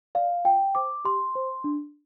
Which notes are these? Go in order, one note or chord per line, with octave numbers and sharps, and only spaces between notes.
D5 F5
F4 G5
C5 D6
G4 C6
C5
D4